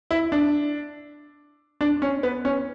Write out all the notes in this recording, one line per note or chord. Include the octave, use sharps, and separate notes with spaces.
E4
D4
D4
C#4
B3
C#4